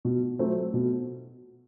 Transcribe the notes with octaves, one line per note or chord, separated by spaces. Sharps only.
B2
F#3 A3 C4
B2